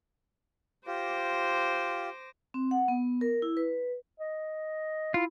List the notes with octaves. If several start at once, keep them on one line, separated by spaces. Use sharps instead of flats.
F4 G4 C5 D6 A#6
C4
F#5
B3
A#4
E4
B4
D#5
E4 F4